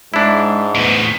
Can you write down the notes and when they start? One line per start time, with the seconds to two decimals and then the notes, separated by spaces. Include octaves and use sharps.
0.14 G#2 G#3 D4 E4
0.75 E2 A2 B3